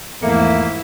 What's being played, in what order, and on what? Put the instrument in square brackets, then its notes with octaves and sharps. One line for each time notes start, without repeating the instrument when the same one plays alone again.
[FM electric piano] E2 A3 [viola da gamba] G#2 F3 E4 [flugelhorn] A#3 [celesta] E5 C#7